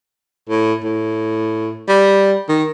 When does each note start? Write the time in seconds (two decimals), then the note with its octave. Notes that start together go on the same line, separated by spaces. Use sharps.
0.50 A2
0.84 A2
1.89 G3
2.49 D#3